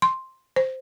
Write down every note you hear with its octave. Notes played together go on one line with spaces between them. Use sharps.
C6
C5